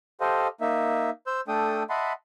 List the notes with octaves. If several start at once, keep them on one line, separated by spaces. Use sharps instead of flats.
G4 A4 C5 D#5 F5
A#3 D#4 E5
C5 E6 G6
A3 D4 A4 G5 D#6
D#5 E5 F#5 A5 B5 C6